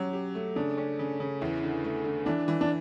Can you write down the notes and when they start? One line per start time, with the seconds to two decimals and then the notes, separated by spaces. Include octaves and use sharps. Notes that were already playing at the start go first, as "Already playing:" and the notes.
Already playing: F#3 C#4 G4
0.13 G4
0.35 A3
0.56 C#3 D4
0.78 C#4
0.99 C#3
1.20 C#3
1.41 E2 E4
1.63 D3
1.84 A3
2.04 D3
2.26 E3 D4
2.48 E3
2.61 D4